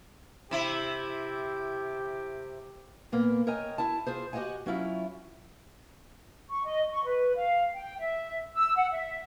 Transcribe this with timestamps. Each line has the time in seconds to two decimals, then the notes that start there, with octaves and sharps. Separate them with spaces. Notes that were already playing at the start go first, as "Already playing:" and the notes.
0.51 C3 E4 G4
3.12 A#2 A#3 B3
3.47 A#4 C#5 D#5 G5 G#5
3.78 E4 A5
4.06 F4 G#4 C5
4.33 F#4 G4 C#5 D#5 F#5 G#5
4.66 F#3 C#4 E4 F4
6.50 C#6
6.65 D#5
6.90 C#6
7.04 B4
7.36 F5
7.74 G5
7.99 E5
8.54 E6
8.75 F#5
8.92 E5